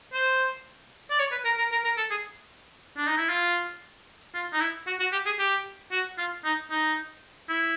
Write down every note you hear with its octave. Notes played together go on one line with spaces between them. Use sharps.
C5
D5
C#5
B4
A#4
A#4
A#4
A#4
A4
G#4
D4
D#4
E4
F4
F4
D#4
E4
F#4
F#4
G4
G#4
G4
F#4
F4
D#4
D#4
E4